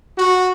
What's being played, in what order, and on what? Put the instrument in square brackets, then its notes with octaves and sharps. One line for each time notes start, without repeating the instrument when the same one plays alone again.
[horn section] F#4